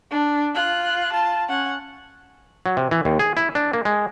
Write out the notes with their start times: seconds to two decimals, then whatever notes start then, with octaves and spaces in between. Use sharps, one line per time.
0.10 D4
0.55 F4 F#6
1.12 F4 A5
1.49 C#4 F#5
2.66 F#3
2.77 C3
2.91 E3
3.05 D#2
3.19 G#4
3.37 E4
3.55 D4
3.73 A#3
3.85 G#3